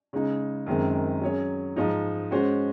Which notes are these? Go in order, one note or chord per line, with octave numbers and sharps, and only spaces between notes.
C#3 G#3 D#4
F#2 D#3 G#3 C4
F#3 C#4 G#4 C#5
G#2 F3 G#3 D#4
G#3 C#4 F#4 C5